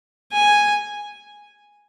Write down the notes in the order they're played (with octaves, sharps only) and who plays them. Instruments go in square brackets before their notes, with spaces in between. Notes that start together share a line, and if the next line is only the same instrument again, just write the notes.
[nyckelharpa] G#5